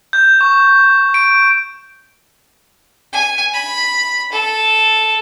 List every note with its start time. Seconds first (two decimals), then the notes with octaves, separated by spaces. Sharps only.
0.13 G6
0.41 C#6
1.14 D7
3.13 G#5
3.54 B5
4.32 A4